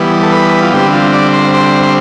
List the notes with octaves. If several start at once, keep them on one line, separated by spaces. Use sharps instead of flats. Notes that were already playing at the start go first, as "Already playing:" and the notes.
Already playing: E3 G3 B3
A4
B4
F4
D3 G3 C4 G4
F4
D5
C5
C5
C5